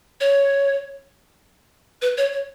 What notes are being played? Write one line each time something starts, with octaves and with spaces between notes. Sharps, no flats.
C#5
B4
C#5
C#5